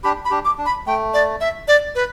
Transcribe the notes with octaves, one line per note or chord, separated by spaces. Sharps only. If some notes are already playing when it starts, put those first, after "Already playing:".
D4 G4 B5
B5
D4 G4
D6
D4
B5
A3 G5
D5
E5
D5
B4